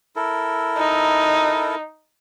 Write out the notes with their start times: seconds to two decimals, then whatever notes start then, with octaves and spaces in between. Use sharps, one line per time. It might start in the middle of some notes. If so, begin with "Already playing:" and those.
0.16 E4 A4 A#4
0.78 D#4